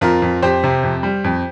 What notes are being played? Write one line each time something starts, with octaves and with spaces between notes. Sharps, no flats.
F2 F4 A#4
F2
F2 G4 C5
C3
F2
G3
F2